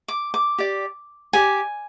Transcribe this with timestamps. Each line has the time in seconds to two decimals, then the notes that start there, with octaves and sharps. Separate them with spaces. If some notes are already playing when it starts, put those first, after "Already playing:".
0.08 D6
0.34 D6
0.58 G4 D5
1.33 G4 D5 G#5